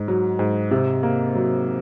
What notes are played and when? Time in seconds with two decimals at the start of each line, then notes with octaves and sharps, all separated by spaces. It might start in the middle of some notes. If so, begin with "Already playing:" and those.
Already playing: G#2
0.08 F#3
0.39 G#2
0.71 C3
1.03 A#3
1.35 F#3